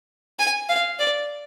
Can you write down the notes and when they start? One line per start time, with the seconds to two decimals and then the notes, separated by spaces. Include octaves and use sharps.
0.39 G#5
0.69 F5
0.99 D5